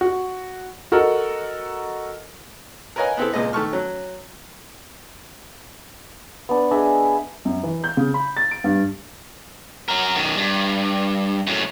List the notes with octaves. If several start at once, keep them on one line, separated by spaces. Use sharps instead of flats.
F#4
F#4 A4 A#4 D#5 F#5
A#4 B4 C#5 D#5 F5 G#5
B3 C4 E4 A4
C#2 A#2 G#3 D#5
D#3 A3 A5 C#6 F6
F#3 C#4
B3 D4
D4 G#4 D#5 E5
F#2
E3
G6
C#3
B5
A6
D7
G2
F#3 A#4
F#2 D#3
G2
F#2 A2